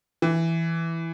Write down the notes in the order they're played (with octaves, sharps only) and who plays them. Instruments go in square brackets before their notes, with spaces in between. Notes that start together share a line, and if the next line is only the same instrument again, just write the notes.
[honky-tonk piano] E3